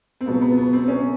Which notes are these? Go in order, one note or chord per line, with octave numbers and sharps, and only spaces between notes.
C4
C#2 B2 F#3 B3
B3
B3
C4
C#4